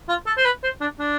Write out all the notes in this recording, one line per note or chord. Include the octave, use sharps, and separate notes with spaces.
F4
A4
C5
B4
C5
D4
D4